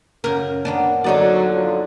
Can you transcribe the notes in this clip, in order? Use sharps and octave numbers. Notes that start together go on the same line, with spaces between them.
F#2 C#3 A#4
D#3 A#3 B3 D4
D3 F#3 D#4 D5
F3 F#3